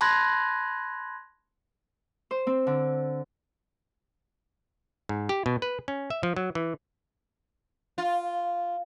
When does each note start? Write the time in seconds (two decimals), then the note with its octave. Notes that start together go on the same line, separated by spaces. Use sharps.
0.01 A5 B5 C6 F#6 G#6 A#6
2.31 C5
2.47 C4
2.67 D3
5.09 G#2
5.29 G4
5.46 B2
5.62 B4
5.88 C#4
6.10 E5
6.23 F3
6.37 F#3
6.55 E3
7.98 F4